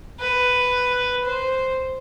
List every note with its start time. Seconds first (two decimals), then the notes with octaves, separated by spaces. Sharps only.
0.20 B4
1.25 C5